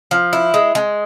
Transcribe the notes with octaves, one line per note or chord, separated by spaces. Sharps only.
F3
E4
G#3
G#3